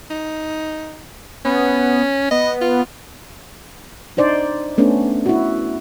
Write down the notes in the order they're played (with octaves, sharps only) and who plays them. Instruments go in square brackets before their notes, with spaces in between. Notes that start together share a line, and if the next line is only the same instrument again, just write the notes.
[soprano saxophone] D#4
[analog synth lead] B3 [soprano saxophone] C#4
[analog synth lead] B3 [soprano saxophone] D#5
[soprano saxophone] F4
[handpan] D4 D#4 C5 D5
A3 B3 C#4 D4
E4 F#4